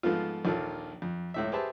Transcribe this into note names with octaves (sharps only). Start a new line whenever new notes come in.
G#2 F3 A3 B3 F4
A#1 D#2 F4 A4
F2
C#2 A2 E5
G4 G#4 B4 C5 E5 A5